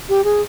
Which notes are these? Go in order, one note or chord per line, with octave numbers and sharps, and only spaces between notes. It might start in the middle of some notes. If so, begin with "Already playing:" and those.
G4
G#4